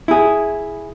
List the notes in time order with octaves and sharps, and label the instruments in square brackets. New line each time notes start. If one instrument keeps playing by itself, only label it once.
[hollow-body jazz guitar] E4 G#4